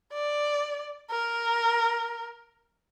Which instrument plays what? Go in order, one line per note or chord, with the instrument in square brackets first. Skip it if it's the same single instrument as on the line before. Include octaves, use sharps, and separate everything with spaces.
[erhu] D5
A#4